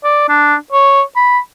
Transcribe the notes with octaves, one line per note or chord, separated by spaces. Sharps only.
D5
D4
C#5
B5